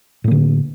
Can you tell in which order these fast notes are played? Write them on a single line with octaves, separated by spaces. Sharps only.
A2 A#3 D3